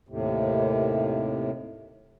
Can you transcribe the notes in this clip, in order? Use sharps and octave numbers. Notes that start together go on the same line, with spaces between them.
D#2 A2 C3